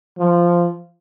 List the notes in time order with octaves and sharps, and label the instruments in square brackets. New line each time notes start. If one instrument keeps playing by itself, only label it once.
[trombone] F3